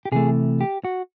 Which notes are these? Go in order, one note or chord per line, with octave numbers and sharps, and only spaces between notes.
G4
C3 E3 A3 G#4
G4
F#4